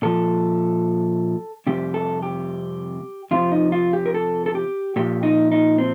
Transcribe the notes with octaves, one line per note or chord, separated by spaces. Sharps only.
A#2 F3 A4
F2 C3 G3 G4
A4
G4
F2 C3 F3 F4
D#4
F4
G4
A#4
A4
A4
G4
A#2 F3 G4
D#4
D#4
C4